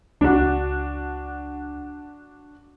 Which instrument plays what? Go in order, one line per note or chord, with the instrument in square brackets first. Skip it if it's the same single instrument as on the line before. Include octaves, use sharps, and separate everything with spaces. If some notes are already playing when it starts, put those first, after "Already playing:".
[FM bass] C#2 [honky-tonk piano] D4 F#4